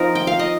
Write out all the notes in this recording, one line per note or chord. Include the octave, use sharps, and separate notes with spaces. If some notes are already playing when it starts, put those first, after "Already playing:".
Already playing: F3 C4 D#4 A#4
G5
F5
D#5